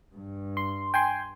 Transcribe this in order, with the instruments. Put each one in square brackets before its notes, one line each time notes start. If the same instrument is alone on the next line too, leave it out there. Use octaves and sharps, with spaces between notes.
[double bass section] G2
[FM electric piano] C6
G5 G#5 C6